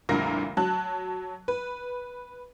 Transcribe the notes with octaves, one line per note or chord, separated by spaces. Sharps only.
F1 C2 A#2 D3 A#4 A#6
F#3 A5 F#6
B4